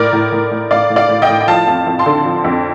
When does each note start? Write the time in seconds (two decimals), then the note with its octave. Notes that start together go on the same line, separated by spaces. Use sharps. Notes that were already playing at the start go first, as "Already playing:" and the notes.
Already playing: A2 A#4 D5
0.13 A2
0.32 A2
0.51 A2
0.71 A2 D5 F5
0.90 A2
0.96 D5 F5
1.09 A2
1.22 D#5 G5
1.29 A2
1.41 G5
1.48 F3 F5 A5
1.67 F2
1.86 F2
1.99 A5 C6
2.06 D3
2.25 F3
2.44 F2